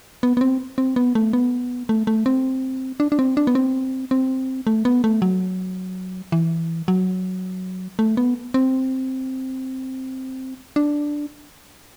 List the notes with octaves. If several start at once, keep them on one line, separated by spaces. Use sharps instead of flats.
B3
B3
C4
C4
B3
A3
B3
A3
A3
C4
D4
D4
C4
D4
B3
C4
C4
A3
B3
A3
F#3
E3
F#3
A3
B3
C4
D4